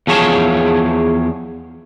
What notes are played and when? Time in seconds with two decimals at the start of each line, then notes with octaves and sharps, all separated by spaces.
0.07 E2 F3 G#4 C#5 A5